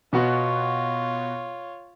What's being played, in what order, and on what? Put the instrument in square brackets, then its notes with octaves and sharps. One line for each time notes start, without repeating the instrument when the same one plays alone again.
[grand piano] B2 B3 F#4 [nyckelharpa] F4 C#5